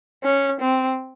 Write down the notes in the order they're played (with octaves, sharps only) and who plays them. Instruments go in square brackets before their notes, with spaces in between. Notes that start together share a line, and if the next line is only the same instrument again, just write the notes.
[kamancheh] C#4
C4